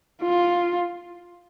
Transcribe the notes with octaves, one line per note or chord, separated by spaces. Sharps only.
F4